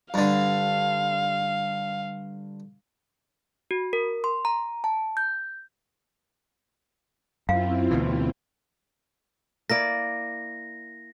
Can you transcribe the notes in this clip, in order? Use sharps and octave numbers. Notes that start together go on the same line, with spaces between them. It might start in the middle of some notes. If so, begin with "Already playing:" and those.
G2 D3 F5
F#4
A#4
C6
A#5
A5
G6
F#2 C4 E4 F4 F5
D2 B2 E3
A#3 E4 D5 A#6